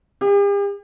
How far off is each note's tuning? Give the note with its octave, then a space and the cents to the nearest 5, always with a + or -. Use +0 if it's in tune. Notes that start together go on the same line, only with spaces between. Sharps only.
G4 +45